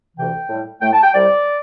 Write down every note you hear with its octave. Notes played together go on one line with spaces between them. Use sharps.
D2 C3 E3 G5
A2 G3
A2 A3 G5
A5
G5
C2 C3 G3 D5